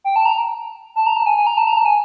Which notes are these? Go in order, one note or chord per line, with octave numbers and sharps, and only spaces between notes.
G5
A5
A#5
A5
A#5
A5
G#5
G#5
A#5
A5
A#5
A5
G#5